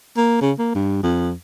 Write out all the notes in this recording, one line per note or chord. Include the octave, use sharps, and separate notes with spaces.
A#3
C#3
A#3
G2
F2